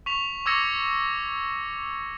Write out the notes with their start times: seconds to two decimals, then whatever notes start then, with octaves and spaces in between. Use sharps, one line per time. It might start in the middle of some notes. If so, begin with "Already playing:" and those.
0.06 C#6 B6 F7
0.46 C#6 D6 E6 G#6 A#6 C#7